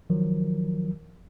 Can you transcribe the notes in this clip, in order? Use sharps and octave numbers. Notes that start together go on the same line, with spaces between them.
D#3 F3 F#3 A#4